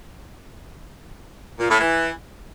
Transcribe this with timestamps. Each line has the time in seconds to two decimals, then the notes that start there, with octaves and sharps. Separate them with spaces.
1.60 A#2
1.70 A2
1.81 E3